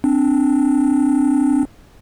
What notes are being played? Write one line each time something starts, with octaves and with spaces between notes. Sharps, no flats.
C4 D4